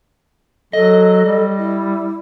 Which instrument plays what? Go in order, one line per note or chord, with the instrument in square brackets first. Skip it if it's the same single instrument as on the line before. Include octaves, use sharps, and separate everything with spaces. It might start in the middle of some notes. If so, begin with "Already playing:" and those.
[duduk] F#3 [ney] A4 [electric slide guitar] D#5
[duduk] G3
[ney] E4